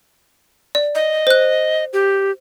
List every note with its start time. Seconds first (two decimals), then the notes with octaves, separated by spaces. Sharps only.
0.75 D5
0.95 D#5
1.27 C5 F#6
1.93 G4